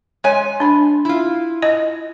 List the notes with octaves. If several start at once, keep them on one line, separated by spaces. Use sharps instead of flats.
G#3 C#5 G#5
D4 B5
E4 F4
D#5